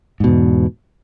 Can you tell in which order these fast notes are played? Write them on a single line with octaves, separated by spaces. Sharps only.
G#2 B2 E2